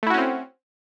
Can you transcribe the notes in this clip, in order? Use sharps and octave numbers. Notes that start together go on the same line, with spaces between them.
A3 C4 C#4 E4 F#4